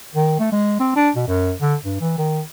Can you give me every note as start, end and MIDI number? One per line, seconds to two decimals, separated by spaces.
0.15 0.39 51
0.39 0.51 57
0.52 0.77 56
0.80 0.93 60
0.96 1.10 62
1.16 1.26 47
1.28 1.52 42
1.61 1.75 50
1.84 1.98 43
2.00 2.13 52
2.18 2.41 51